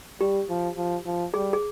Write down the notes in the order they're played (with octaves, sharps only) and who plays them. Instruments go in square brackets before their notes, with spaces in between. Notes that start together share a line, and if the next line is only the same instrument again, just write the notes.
[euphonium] G3 [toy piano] G4
[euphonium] F3
F3
F3
[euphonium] G3 [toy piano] G#4
[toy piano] G#4